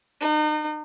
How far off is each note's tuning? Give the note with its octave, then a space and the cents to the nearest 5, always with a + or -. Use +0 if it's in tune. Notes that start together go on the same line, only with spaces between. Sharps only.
D#4 -35